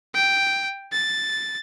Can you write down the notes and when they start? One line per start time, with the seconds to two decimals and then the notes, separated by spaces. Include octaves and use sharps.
0.15 G5
0.92 A6